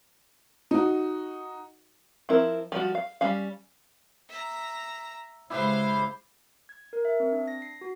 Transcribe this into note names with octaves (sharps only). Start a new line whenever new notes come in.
D#4 F#4
F3 C4 E4 A#4
F3 G3 F#4
F5
G3 C#4 F5
E5 A#5
C#3 G#3 E4 G4 B4 C5 F5
G#6
A#4
E5
C4
D4
A#6
C7
F#4